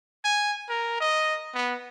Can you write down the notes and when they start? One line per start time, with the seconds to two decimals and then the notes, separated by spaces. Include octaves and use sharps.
0.24 G#5
0.69 A#4
1.00 D#5
1.55 B3